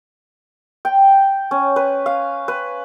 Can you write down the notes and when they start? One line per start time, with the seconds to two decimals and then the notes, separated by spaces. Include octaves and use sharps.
0.85 G5
1.51 C#4
1.76 B4
2.06 F5
2.48 B4